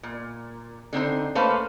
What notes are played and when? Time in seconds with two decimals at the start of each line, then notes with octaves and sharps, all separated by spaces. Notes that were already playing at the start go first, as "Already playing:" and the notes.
0.03 A#2
0.93 D3 C4 D#4 C5
1.35 A3 A#3 C#4 B4 C5 F5